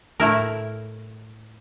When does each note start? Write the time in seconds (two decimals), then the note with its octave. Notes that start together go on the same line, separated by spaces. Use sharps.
0.20 A2 A3 E4 A#4